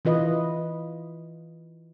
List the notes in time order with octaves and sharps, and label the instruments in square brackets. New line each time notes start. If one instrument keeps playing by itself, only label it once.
[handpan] E3 F4 B4 D#5